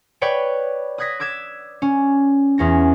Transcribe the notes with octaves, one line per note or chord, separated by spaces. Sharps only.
B4 C#5 D5 G5
D#6 F#6 G#6 A#6 B6
D6 E6 G#6 B6 E7
C#4
E2 C#4 A#6